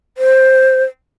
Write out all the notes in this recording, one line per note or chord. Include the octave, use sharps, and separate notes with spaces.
C5